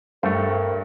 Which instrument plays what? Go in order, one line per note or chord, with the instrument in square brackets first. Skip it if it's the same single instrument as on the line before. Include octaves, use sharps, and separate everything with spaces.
[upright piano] G2 [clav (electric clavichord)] A3 [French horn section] A#4 [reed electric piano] C5 G5 C#6